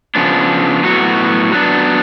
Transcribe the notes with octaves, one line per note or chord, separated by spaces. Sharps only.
C#3 F3 B3 D4
A2 F#3 B3 F#4
F#3 B3 D4